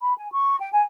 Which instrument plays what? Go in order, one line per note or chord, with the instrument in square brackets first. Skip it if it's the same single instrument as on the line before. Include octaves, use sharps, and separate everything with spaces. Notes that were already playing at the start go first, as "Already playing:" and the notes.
[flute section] B5
G#5
C#6
G5
G#5